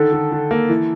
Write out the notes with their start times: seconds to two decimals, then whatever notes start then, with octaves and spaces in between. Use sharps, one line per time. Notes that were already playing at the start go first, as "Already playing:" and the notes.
Already playing: D3 D#3 A4
0.12 D3
0.32 D3
0.51 A#3
0.69 E3